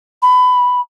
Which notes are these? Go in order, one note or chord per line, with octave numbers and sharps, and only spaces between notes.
B5